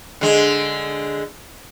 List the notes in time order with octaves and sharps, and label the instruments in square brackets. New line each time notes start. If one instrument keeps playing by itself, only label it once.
[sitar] D3 G#3